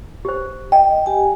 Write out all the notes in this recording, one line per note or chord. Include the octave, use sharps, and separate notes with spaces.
G4 C5
D#5 G5
G4 G#5